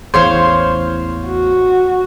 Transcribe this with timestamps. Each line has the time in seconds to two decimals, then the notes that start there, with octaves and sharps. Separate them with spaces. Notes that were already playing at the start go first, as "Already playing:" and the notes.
0.14 A1 E2 E3 C5 C#5 F5
1.26 F#4